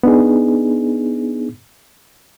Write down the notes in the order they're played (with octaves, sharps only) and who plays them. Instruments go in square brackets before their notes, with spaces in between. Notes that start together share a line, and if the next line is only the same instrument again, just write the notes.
[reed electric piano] B3 D4 D#4 G#4